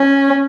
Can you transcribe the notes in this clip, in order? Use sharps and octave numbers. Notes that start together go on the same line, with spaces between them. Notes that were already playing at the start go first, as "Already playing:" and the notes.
Already playing: C#4